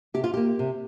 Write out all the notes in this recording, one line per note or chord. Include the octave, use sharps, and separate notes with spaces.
C3 G4
F4
A#3 G4
C3